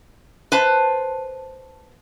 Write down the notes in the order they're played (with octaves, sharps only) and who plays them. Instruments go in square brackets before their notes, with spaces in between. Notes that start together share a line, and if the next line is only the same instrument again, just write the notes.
[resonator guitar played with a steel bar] B4 C5 A5